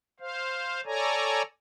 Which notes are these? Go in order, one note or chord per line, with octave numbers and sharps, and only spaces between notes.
C5 F5
A4 C#5 D5 G#5 A#5